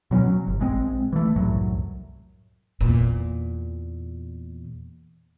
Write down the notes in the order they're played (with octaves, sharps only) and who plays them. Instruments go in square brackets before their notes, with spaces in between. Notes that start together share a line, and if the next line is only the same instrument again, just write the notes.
[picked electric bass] B2 F#3 C4 C#4
F#3
G1
A#1 G#3 C4
E3 A3
C2 F#2 A2 F#3
[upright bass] E2 A#2